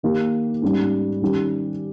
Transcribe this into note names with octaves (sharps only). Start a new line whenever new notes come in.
D#3 A#3 D#4 G4
G#2 G3 C#4
D#3 G3 C#4 G4